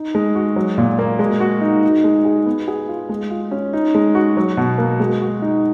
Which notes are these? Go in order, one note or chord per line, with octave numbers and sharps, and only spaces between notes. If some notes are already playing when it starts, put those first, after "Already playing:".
Already playing: D#4
G#3
F#4
F#3
A#2
A#3
G#3
F#4
D#4
D#4
G#3
G#4
B3
G#4
F4
G#3
F4
C#4
D#4
G#3
F#4
F#3
B2
A#3
G#3
F#4
D#4